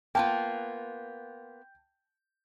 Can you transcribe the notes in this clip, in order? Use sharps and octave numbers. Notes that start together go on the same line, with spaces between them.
A#3 B3 F4 G5 A5